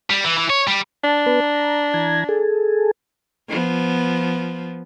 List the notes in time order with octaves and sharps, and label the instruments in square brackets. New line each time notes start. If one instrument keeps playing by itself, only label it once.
[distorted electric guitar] G3
E3
E3
C#5
G3
[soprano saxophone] D4 [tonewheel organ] A5
[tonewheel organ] B3 B4
A#5
E3 A#5 G#6
G#4 A4
[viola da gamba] F3 B3